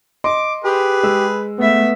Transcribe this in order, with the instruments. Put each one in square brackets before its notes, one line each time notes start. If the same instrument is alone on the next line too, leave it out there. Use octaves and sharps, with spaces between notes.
[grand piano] D#5 C6 [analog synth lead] D6
[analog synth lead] G4 [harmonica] G#4 B4
[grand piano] G#3 E6
[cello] A3 E5 [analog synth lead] B3